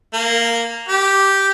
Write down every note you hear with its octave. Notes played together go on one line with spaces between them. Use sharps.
A#3
G4